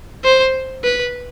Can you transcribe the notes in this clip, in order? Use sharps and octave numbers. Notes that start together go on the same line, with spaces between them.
C5
B4